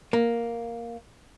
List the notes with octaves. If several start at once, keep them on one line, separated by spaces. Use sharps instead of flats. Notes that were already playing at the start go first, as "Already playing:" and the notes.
A#3